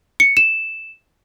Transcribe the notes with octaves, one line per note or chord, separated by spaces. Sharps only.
C#7
E7